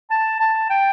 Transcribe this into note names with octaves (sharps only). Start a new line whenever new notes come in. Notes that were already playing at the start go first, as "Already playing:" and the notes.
A5
A5
G5